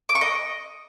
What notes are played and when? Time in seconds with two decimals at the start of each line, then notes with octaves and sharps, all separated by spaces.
0.09 D6
0.15 C#6
0.21 D#5